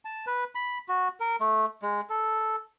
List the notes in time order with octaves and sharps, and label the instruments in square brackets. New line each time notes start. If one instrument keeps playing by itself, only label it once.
[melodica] A5
B4
B5
F#4
A#4
A3
G#3
A4